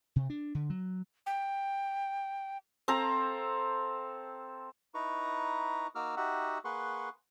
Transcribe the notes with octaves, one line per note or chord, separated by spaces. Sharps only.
C3
D4
D3
F#3
G5
C4 A4 F5 A#5
D#4 E4 B4 A#5 C#6
A#3 D#4 F#4 D6 E6 F6
D#4 F#4 G4 E5 F#5
A#3 G#4 B4 F#5 C6 C#6